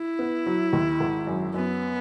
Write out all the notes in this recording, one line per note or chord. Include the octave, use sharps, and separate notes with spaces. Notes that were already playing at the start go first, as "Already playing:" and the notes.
Already playing: E4
B3
F#3
D#2
G#1
F#2
F#2 B3